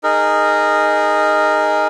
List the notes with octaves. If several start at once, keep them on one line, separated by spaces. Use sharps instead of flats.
D#4 G#4 A#4